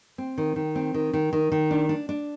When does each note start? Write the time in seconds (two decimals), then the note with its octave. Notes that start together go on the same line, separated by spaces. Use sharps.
0.18 C4
0.38 D#3
0.56 D#3
0.76 C4
0.94 D#3
1.13 D#3
1.33 D#3
1.52 D#3
1.71 D4
1.89 D4
2.09 D4